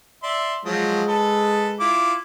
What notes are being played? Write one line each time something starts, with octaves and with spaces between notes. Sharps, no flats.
D5 E5 C6
F3 F#3 G#3
A4 B4
E4 F4 D6